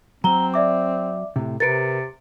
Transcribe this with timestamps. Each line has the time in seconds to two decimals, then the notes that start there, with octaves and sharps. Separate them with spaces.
0.24 F#3 C4 A#5 G7
0.54 D5 E5 D6
1.36 A2 C3
1.60 C3 A#4 B4 A6 C#7 D7